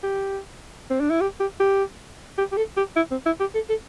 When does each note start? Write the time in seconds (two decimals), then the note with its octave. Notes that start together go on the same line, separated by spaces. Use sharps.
0.03 G4
0.90 C4
1.00 D4
1.10 E4
1.21 G4
1.40 G4
1.60 G4
2.38 G4
2.52 G4
2.57 A4
2.77 G4
2.96 E4
3.11 C4
3.26 E4
3.40 G4
3.55 A4
3.70 A4